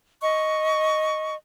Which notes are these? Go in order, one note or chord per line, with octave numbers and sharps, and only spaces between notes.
D#5 C#6